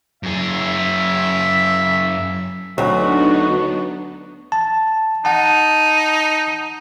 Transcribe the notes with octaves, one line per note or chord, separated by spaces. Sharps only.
F#2 G#4 E5
D2 F#3 B3 D4 D#4 F#4
A5
D#4 F#5 A5